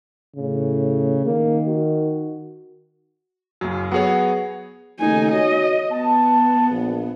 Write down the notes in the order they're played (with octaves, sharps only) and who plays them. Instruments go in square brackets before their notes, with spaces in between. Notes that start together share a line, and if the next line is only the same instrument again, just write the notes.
[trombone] A2 [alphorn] C#3
[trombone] D#3 [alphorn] A#3
[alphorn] F#4
[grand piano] F#1 F#2 [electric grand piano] F#3
[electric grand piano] F#3 C#5 [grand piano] B3 F#4 G#4
[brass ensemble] D#2 C#3 A3 [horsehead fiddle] D#4 G#5
[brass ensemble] F#4 C#5 [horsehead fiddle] D#5
[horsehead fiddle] B3 [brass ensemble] A5
[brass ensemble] A#1